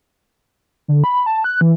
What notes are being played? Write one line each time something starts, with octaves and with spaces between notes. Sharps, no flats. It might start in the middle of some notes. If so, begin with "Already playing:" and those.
D3
B5
A5
F#6
E3